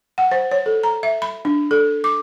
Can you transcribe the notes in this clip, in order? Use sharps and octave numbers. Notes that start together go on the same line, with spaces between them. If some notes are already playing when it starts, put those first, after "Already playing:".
F#5
C5
C#5
A4
A#5
E5
B5
D4
A4
D6